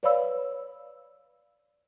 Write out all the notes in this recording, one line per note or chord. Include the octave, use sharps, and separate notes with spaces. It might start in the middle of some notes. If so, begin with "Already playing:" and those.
B4 C#5 D5 F5 B5 E6